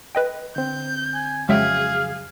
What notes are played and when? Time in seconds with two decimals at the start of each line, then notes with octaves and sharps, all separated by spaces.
0.15 B4 D#5 G5
0.56 D3 C4 G6
1.14 G#5
1.49 F2 C#3 F#3 G#3 G#4 E5 F5 G5